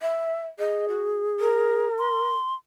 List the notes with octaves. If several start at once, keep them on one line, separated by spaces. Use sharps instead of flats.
E5
G#4 D#5
F#4
A#4
C6